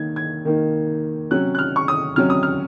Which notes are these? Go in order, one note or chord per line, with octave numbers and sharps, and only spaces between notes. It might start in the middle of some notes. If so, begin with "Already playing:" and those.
Already playing: D#3 A#3 D#4 G#6
G#6
D#3 A#3 D#4
C3 F#3 C#4 F#6
F#6
F6
C#6
D#6
C3 F#3 C#4 F6
D#6
F6